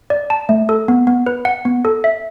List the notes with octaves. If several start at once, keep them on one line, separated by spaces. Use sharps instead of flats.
D5
A5
A3
A4
B3
B3
B4
F#5
B3
A4
E5